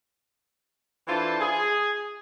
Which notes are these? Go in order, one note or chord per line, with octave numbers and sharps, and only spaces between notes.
E3 D4 E4 F4 A4 C5
G#4